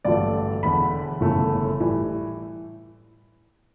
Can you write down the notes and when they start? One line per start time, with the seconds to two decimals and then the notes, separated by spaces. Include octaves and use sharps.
0.05 A1 G2 D3 F#3 A3 D5
0.63 E1 E2 D3 B5
1.21 G1 F#2 C#3 E3 A3
1.80 A2 E3 G3